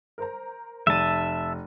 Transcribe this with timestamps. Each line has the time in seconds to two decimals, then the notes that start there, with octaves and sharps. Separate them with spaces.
0.18 A#4 C5 A#5
0.87 F1 E5 A5 D#7